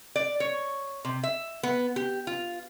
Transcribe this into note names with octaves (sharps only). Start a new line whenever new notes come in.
D5
C#5
C3
E5
B3
G4
F4